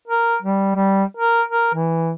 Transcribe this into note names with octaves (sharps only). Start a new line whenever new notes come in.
A#4
G3
G3
A#4
A#4
E3